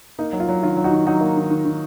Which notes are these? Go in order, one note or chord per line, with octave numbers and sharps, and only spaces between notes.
A#3 D#4
F#3
F4
F#3
D#3 F4
F#3
D#4 F#4
D#3
F#3 D#4 F#4
A#3
D#3
D#3
D#3